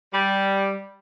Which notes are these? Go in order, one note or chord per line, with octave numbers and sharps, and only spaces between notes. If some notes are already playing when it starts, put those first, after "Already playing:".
G3